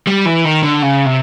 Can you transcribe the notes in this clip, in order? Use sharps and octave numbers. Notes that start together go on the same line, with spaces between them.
G3
E3
D#3
D3
C#3
C3